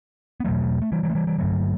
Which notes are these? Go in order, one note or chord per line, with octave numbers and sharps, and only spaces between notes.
B3
E2 B2 F#3 A3
A3
E3 G3
E3 G3
A3
E3 G3
E3 G3
G2 D3 F#3 A3